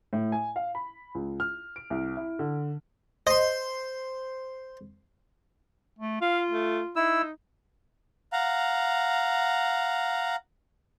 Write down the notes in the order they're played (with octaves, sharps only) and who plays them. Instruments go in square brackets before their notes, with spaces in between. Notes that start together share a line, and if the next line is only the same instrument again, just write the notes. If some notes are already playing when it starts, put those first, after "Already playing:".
[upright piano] A2
G#5
F5
B5
C#2
F6
D7
C2
E4
D3
[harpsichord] C5 C6 [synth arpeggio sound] D#5
[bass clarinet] A3
[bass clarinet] F4 [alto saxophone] F5
[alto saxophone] A3
[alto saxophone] D#4 [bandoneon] E4 E6
[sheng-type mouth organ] F5 F#5 A#5